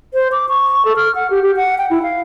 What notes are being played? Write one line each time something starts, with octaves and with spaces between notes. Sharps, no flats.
C5
D6
C#6
A4
F6
F#5
G4
G4
F#5
G5
E4
F5